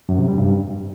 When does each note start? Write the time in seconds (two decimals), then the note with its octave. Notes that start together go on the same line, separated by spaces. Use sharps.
0.09 F#2
0.18 C3
0.28 G3
0.38 G2